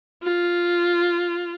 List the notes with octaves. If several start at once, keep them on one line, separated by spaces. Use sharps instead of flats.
F4